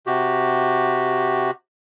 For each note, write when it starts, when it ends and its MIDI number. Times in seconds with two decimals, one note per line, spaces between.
0.07 1.51 48
0.07 1.51 66
0.07 1.51 67